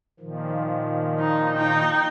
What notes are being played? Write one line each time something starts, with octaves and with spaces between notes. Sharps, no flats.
A#2 D#3 F3
D#4
D#4 G5